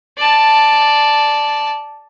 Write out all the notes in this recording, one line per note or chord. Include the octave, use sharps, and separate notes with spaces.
D5 A5